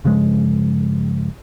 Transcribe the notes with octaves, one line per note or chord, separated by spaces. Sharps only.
G2 C#3 F3 G#3